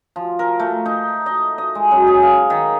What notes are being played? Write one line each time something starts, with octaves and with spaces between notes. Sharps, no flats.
F3
A#4
A3
D#4
D#5
D#5
G#3
F#2
G#4
F5
D#3